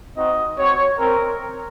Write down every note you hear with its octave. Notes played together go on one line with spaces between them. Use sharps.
C4 D#4 F#4 D#5
C4 F#4 C#5
C4 A#4